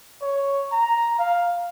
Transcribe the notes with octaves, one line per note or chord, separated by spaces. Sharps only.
C#5
A#5
F5